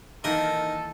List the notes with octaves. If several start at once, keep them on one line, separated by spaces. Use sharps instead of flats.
D#3 E3 A#3 D#4 A4 A#4